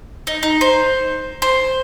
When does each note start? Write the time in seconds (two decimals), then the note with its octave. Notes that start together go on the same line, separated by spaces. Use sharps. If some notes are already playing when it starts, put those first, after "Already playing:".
0.27 D#4
0.43 D#4
0.61 C5
1.42 C5